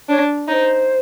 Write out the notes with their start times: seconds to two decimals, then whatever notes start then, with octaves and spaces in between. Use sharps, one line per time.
0.09 D4 C#5
0.48 D#4 C5 C#5